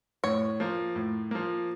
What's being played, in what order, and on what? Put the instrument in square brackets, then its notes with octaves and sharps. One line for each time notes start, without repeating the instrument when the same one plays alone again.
[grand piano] A2 [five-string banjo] C#5
[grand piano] F3 A#3
A2
F3 A#3